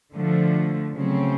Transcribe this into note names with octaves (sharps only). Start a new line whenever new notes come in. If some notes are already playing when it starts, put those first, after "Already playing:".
D3 F3 A3
C#3 F#3 A3 C4